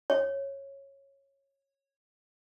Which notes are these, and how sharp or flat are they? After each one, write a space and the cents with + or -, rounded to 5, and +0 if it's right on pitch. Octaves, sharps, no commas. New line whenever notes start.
C#5 -10